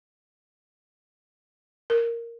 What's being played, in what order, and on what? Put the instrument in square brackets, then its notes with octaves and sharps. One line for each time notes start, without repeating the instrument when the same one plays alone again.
[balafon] A#4